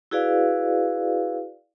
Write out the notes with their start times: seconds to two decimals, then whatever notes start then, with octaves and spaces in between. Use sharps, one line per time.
0.11 E4 F#4 G#4 B4 D5 F5